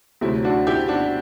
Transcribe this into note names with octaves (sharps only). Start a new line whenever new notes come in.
D2 C3 F#3 A3 E4
D4 F#4
E4 G4
D4 F#4